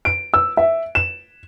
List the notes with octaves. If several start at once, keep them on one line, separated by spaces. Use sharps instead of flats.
D7
E6
E5
E7